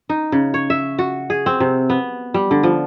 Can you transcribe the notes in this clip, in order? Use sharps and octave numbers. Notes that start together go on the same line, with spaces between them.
D#4
C#3
C#5
E5
F#4
G#4
C4
C3
B3
G3
D3
F3